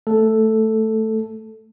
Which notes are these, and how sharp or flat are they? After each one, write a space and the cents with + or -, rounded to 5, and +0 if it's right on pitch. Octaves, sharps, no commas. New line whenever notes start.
A3 +0 A4 +0